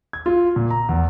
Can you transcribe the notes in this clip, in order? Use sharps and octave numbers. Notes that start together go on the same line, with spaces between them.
G#6
F4
A#2
A#5
E2